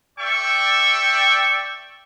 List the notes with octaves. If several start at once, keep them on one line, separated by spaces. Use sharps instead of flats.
A4 D5 E5 G5 C#6